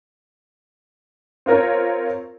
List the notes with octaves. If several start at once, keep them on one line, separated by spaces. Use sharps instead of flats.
C4 F4 A#4 C#5